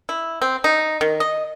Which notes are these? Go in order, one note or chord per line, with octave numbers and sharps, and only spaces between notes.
E4
C4
D#4
D#3
D#5